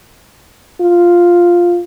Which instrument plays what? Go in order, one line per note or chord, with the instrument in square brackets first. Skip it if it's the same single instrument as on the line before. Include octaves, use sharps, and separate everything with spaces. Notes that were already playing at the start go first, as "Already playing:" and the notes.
[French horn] F4